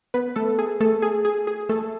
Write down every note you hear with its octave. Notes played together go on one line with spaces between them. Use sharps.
B3 B4
A3 A4
G#4
A3 A4
G#4
G#4
G#4
A3 A4